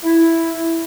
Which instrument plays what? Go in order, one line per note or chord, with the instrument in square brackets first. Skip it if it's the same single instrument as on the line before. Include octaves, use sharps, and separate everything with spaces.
[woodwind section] E4